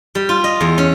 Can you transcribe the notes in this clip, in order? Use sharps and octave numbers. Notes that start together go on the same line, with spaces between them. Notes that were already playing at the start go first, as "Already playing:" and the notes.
G3
F4
D#5
E2
C#4